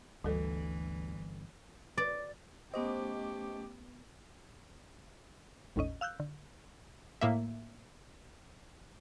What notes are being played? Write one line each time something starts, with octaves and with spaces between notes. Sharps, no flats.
G1 D2 D3 E3 G3 A4
D5
A3 B3 C#4 G4 C5 D#5 D6 D#6
G#1 D#2 A2 C#4 D#5
F5 E6 F#6 G6
D3
A2 A#3 E5